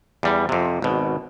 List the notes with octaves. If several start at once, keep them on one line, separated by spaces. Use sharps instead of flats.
E2 G3
F2 C3
G#1 B2